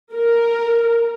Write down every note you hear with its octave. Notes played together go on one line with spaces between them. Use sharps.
A#4